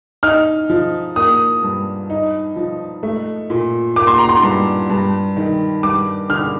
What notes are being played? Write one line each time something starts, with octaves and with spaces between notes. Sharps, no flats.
D#4 F6
F3
A#3 D#6
G2
D#4
F3
A3
A#2
A#3 D6
C6
A#5
C6
G2
G2
D#3
G2 D6
D3 F6